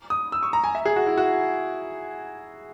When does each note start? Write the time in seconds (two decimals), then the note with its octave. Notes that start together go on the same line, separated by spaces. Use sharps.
0.10 D#6
0.32 E6
0.43 C#6
0.53 A#5
0.64 G#5
0.75 E5
0.85 G#4
0.96 F#4
1.06 E4
1.17 F#4